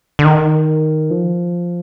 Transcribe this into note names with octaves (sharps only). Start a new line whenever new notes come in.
D3
D#3
F3